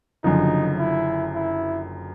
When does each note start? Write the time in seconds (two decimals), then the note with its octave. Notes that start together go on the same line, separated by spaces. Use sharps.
0.24 F#1 F#2 D3 F3 D#4
0.78 E4
1.34 E4